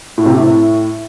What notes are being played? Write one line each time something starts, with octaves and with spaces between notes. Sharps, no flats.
A2
C3
A2